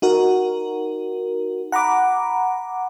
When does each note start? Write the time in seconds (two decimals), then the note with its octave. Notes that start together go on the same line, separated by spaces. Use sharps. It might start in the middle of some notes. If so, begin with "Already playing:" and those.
0.02 D#4 F#4 A#4
1.72 F#5 A#5 B5 D6